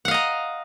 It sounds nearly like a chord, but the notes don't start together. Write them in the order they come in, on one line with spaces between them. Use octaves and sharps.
F#5 F5 D#5 A#5